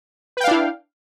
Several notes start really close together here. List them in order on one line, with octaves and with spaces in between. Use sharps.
B4 G5 F5 D4 E4